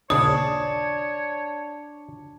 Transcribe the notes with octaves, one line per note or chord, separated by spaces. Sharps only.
A#1 D#2 C#3 D4 C#5 D#6